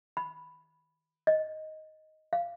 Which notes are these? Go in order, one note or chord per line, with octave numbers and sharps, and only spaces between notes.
B5
D#5
F5